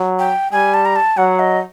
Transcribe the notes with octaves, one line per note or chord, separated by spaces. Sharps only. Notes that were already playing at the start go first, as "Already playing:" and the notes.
Already playing: F#3
G5
G3 G#5
A5
A#5
A5
F#3 F#5
D#5